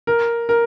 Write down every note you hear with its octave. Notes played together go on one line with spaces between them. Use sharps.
A#4
A#4